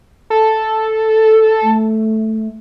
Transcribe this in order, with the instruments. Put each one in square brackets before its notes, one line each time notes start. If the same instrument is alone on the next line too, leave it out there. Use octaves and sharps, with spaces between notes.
[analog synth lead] A4
[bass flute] A3